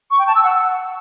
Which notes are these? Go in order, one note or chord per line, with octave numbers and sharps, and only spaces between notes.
C#6
G5
A5
E6
F#5